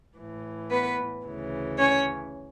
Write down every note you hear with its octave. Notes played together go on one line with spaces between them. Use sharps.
A2 E3
B3 B4
D2 C#3 E3
C#4 C#5